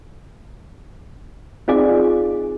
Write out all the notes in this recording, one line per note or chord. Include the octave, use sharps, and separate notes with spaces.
C4 D#4 F4 G#4 D5